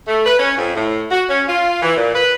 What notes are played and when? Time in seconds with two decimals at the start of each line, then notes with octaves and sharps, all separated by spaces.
0.07 A3
0.26 B4
0.38 C#4
0.57 F2
0.74 A2
1.11 F#4
1.29 C#4
1.48 F4
1.82 E3
1.97 A#2
2.15 B4